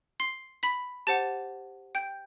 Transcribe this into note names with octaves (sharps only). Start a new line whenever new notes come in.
C6 C7
B5 B6
G4 C5 F#5 A5 A6
G5 G6